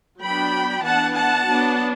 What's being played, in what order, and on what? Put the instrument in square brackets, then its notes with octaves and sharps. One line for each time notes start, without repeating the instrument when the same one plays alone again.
[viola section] F#3 B3 D4 G5 B5
E3 B3 D4 F#5 A5
F#5 A5
F#3 B3 D4